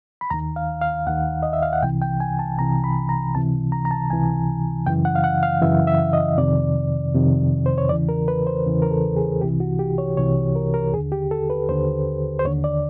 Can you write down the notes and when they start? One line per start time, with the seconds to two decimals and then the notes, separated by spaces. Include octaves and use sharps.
0.21 B5
0.30 D#2 D#3 A#5
0.56 F5
0.81 F5
1.07 D#2 D#3 F#5
1.43 D#5
1.53 E5
1.63 F5
1.73 F#5
1.82 C2 C3 E3 G5
2.02 G5
2.20 G#5
2.39 A5
2.58 C2 C3 E3 A#5
2.84 B5
3.09 A#5
3.34 C#2 C3 E3 A5
3.72 A#5
3.85 A#5
3.91 A5
4.10 C#2 C3 E3 G#5
4.86 F#2 C#3 E3 G5
5.05 F#5
5.15 F5
5.24 F#5
5.43 F5
5.62 F#2 C#3 E3 E5
5.87 E5
6.13 D#5
6.38 F2 C3 D#3 D5
7.14 F2 C3 D#3
7.66 C5
7.78 C#5
7.89 E2 C#3 E3 D5
8.09 A#4
8.28 B4
8.47 C5
8.66 E2 C#3 E3
8.82 A#4
8.91 A4
9.17 G#4
9.41 C2 C3 E3 G4
9.60 F#4
9.79 G4
9.98 C#5
10.17 C2 C3 E3 C#5
10.56 A#4
10.74 A#4
10.93 D#2 G#4
10.97 D3
11.12 G4
11.31 A4
11.50 B4
11.69 D#2 D3 C5
12.39 C5
12.45 D#2 D3 C#5
12.64 D5